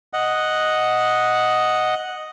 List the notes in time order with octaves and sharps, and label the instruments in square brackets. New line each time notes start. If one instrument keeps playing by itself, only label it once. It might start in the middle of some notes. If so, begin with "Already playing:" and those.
[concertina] D#5 F#5